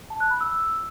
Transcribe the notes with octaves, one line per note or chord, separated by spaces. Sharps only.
A5
F#6
B5
E6